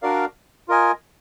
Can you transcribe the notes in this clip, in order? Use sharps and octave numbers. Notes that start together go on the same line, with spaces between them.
D4 F#4 A#4 D5 F5
F4 A#4 D#5 G#5